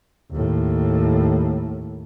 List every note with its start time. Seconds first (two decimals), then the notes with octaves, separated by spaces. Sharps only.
0.32 D#2 A2